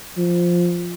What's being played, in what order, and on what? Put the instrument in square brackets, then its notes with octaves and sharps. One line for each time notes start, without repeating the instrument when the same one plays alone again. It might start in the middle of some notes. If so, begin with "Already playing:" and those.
[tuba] F3